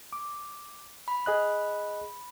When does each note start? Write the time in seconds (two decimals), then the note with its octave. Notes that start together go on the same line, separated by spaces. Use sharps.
0.13 D6
1.08 B5
1.26 G#4 D#5 F#6